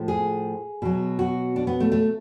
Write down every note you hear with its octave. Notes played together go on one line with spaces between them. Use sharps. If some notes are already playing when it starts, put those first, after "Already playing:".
Already playing: A2 F3
G#4
B2 F#3
F#4
D4
B3
A3
A3